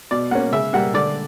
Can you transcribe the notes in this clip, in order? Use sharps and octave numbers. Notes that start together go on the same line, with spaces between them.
B2 D5
A#3 C#4 F#5
C#3 E5
G3 A#3 F#5
D3 D5